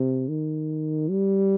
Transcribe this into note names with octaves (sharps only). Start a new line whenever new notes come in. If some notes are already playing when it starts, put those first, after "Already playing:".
Already playing: C3
D#3
G3